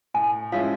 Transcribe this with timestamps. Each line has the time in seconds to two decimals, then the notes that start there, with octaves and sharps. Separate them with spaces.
0.14 A2 G#5
0.52 F3 G#3 C#4 E4 F5